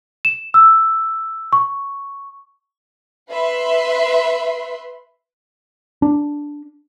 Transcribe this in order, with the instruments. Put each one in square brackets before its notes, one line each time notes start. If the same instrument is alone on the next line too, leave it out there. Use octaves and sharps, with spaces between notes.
[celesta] E7
E6
C#6
[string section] B4 E5 B5 C6
[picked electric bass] D4